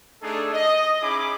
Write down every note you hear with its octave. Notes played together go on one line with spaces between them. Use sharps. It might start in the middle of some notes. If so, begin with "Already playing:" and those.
A3 D4 D#4 G#4 A4
D#5
C#4 D#4 E4 G#4 B5 D6